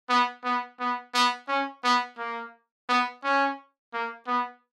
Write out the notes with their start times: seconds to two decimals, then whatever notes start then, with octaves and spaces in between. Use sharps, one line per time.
0.09 B3
0.44 B3
0.80 B3
1.14 B3
1.48 C#4
1.84 B3
2.18 A#3
2.89 B3
3.24 C#4
3.93 A#3
4.28 B3